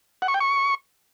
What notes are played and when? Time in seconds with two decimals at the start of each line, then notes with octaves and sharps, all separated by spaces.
0.22 F#5
0.28 C#6
0.34 G5
0.40 C#6